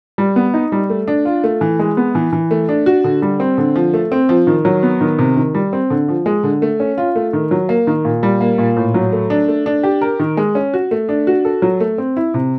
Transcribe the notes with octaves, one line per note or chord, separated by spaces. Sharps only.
G3
B3
D#4
G3
A3
D4
F4
A3
E3
G#3
B3
E3
E3
A3
D4
F#4
D3
G3
C4
D3
F3
A3
C4
F3
D#3
F#3
B3
D#3
C3
D#3
G3
C4
D3
F3
G#3
D3
A3
C#4
F4
A3
D#3
F#3
A#3
D#3
A#2
G3
A#3
A#2
A2
F#3
A3
D4
A3
D4
G4
A#4
D#3
G#3
C#4
F#4
A3
D4
F#4
A4
F#3
A3
C4
E4
C3